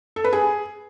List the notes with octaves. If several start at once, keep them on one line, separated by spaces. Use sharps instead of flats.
A4
B4
G#4